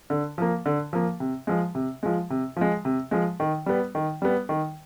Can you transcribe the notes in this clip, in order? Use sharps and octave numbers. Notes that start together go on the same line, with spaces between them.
D3
F3 A#3
D3
F3 A#3
C3
F3 G#3
C3
F3 G#3
C3
F3 G#3
C3
F3 G#3
D#3
G3 B3
D#3
G3 B3
D#3